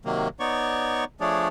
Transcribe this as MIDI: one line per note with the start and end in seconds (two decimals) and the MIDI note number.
0.05 0.28 48
0.05 0.28 51
0.05 0.28 54
0.05 0.28 58
0.40 1.04 59
0.40 1.04 63
0.40 1.04 73
0.40 1.04 74
0.40 1.04 85
1.21 1.48 53
1.21 1.48 57
1.21 1.48 62
1.21 1.48 68
1.21 1.48 73
1.21 1.48 74